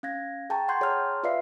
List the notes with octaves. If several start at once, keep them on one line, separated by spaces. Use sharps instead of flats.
C#4 F5 G#6 A#6
G#4 G5 A5 A#5 C#6
F#5 G5 C6 C#6 G6 G#6
G#4 C#5 A5 A#5 C6 F6
F4 B4 D5 E5 F5 C7